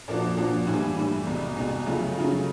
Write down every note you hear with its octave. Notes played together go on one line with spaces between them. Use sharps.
A#2 F3 A#3 D4 F#4
A#2 F3 A#3 D4 F#4
A2 E3 G3
A2 E3 G3
C2 B2 G#3
C2 B2 G#3
C#3 F#3 A3 C#4 F4
C#3 F#3 A3 C#4 F4